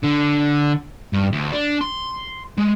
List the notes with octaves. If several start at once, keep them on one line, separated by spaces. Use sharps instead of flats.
D3
G2
D2
D4
C6
G#3